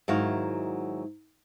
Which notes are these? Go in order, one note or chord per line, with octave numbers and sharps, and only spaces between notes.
G#2 D#3 F#3 E4 F#4 F5